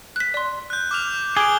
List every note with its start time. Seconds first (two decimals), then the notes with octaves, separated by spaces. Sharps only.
0.16 F#6 B6
0.34 D5 C6
0.70 F#6 G6
0.91 D6 F6 F7
1.37 G#4 D6 D7 G7